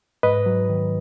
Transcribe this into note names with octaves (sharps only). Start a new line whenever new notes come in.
G#2 B4 D#5
F#3
D#3